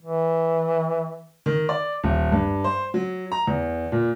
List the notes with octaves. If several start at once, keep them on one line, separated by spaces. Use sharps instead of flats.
E3
D#3
D5
D#1
G2
C5
F#3
A#5
E2
A#2